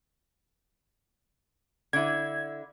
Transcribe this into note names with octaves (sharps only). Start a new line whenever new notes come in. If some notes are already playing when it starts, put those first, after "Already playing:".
D3 E4 G#6